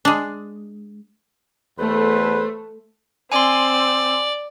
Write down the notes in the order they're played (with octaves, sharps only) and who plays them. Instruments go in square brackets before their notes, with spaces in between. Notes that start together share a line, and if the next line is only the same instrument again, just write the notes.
[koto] G#3 D4
[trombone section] E2 B4 C5 [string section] A3
[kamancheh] C4 [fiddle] D5 [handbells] G#5 C6